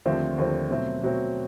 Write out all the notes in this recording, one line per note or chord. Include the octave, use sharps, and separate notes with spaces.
D#2 D3 F3 A3 C4
D#2 D3 F3 A3 C4
B2 F#3 A3 C4
B2 F#3 A3 C4